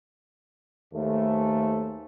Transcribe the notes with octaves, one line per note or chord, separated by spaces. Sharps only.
D#2 G#2 A3